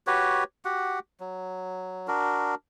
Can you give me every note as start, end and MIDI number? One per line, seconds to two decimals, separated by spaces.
0.07 0.44 66
0.07 0.44 67
0.07 0.44 71
0.07 0.44 73
0.65 0.99 66
0.65 0.99 67
0.65 0.99 78
1.20 2.07 54
2.08 2.55 62
2.08 2.55 66
2.08 2.55 70